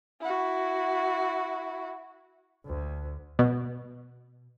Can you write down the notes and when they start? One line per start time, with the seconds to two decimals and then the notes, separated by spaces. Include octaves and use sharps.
0.21 E4 F#4
2.66 D2
3.39 B2